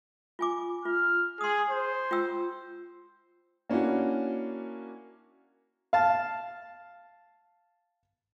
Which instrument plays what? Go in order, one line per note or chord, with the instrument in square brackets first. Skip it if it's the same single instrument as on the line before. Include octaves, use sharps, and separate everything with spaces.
[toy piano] F4 G#5 D6
[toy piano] F4 [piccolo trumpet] F6
[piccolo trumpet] G#4 [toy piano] C6 D#6
[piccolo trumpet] C5
[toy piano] F4 G5 E6
[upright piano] A#3 C#4 D4 E4 F#4
[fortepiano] F5 A5